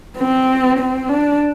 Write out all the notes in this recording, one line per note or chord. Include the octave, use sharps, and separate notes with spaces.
C4
C4
D4